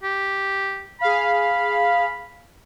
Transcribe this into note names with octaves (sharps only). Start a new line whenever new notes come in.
G4
G#4 F5 B5